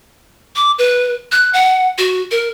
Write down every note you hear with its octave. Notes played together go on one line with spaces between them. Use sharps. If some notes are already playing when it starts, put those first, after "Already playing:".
D6
B4
F#6
F#5
F#4
A#4